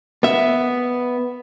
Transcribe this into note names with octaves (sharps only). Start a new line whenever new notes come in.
B3 E5